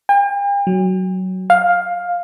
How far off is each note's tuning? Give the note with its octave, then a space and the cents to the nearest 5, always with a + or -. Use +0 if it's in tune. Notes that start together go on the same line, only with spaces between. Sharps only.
G5 +45
F#3 +10
F5 +10